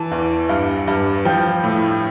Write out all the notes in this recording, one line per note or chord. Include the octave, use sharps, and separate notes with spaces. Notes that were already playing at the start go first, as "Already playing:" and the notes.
Already playing: E3 A5
E2
G2
G2
F3 G5
A2